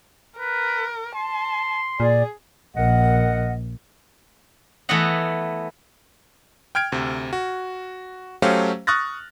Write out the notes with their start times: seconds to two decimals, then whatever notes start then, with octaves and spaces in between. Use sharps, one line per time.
0.39 A#4 B4
1.16 A5 C6
2.00 A#2 G#4 D5
2.76 A#1 A#4 D#5 F#5
4.89 E3 A3 B3 F#4 D#5 F#5
6.75 G5 F6 G#6 D7
6.92 D2 C3
7.33 F#4
8.42 F#3 A3 C#4 G4 C5 F5
8.87 C#6 D#6 F6 F#6 A6 A#6